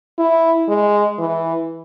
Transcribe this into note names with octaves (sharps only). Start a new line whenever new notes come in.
E4
G#3
E3